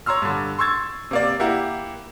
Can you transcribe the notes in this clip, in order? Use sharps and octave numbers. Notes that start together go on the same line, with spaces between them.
C#5 A#5 C6 E6 F6
G2 D3
C6 C#6 E6 G#6 A6
C3 A#3 D5
A#3 E4 G4 F#5 A#5